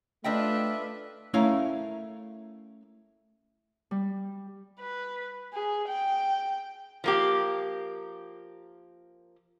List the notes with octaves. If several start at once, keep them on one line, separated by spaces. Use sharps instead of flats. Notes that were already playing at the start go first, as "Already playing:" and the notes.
A3 D4 F4 B4 D#5 E5 G5
A3 C#4 E4 A#4 F5
G3
B4
G#4
G5
F3 A#3 G4